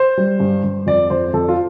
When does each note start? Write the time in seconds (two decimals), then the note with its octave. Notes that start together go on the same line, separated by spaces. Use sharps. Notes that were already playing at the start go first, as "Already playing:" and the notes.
Already playing: C5
0.17 G3
0.40 G2
0.64 G2
0.86 F2 D5
1.10 F2 C5
1.34 F2 A4
1.49 F4